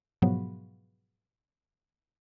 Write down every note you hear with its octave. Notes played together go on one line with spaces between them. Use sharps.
G#2 B2 F3 F#3 B3